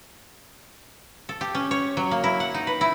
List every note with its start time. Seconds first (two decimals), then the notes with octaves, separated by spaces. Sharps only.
1.29 A4
1.41 G4
1.55 C#4
1.71 C#5
1.97 F#3
2.11 A#3
2.24 E4
2.40 F#5
2.54 D#4
2.67 B4
2.81 E4